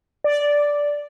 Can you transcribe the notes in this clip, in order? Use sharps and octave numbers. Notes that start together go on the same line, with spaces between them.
D5